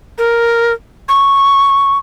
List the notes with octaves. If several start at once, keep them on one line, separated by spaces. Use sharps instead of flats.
A#4
C#6